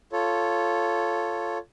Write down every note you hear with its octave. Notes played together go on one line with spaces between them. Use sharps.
F4 A4 C#5